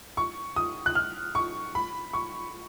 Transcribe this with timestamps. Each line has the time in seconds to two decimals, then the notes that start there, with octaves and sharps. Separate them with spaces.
0.17 C#6
0.56 D#6
0.86 F#6
0.95 F6
1.35 C#6
1.75 B5
2.13 C#6